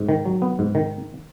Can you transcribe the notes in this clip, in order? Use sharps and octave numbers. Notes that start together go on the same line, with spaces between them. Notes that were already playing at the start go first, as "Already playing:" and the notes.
Already playing: G#2
D#3
F#3
B3
G#2
D#3